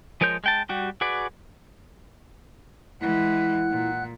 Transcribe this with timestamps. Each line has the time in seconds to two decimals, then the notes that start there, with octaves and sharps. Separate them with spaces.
0.21 F3 G#3 A#4 C#5 G6
0.44 G#3 G5 A5
0.69 G3 F#4 G4
1.01 F#4 G#4 B4 D5
3.01 E3 G#3 E4 F#5 F#6
3.71 A#2